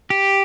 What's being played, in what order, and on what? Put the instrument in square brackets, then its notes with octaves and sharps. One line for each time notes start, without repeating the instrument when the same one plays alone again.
[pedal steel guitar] G4